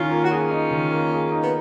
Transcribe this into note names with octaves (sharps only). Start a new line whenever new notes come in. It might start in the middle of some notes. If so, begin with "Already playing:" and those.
Already playing: D#3 C#4 F4
A#3
F#4
C#4 F4 G#4
D#4
D#3
A#3
G#4
D#4
B3